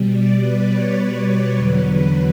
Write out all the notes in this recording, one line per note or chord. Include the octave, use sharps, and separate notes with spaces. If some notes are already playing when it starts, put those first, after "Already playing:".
Already playing: B2 G3
D5
B4
C#5
D5
C#5
E2 D3 F#3 B4